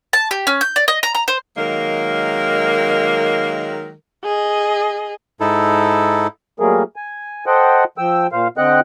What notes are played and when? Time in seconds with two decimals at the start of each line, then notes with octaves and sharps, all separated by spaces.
0.13 A5
0.31 G4
0.47 C#4
0.61 G6
0.76 D5
0.88 D#5
1.03 A#5
1.15 A#5
1.28 C5
1.57 D#3 F#3 G#3 A#3 A#4
4.24 G#4 D#5
5.40 G#2 D#4 E4 A4
6.60 F#3 G3 A3 A#3 G#4 A#4
6.96 G#5
7.46 A4 C5 D#5 F#5 G5
7.98 F3 G5 E6
8.32 A#2 C5 F5
8.58 D3 C4 D#5 F#5 G5 F#6